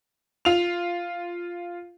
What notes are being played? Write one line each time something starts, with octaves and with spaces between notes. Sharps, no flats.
F4 F7